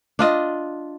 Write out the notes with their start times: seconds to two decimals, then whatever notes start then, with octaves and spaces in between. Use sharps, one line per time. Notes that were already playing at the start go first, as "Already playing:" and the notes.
0.19 D4 F4 D#5